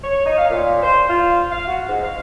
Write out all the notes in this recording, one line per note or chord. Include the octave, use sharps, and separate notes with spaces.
C#5
D#4
F5
A#2
C5
F4
F5
F#4
G#2
F5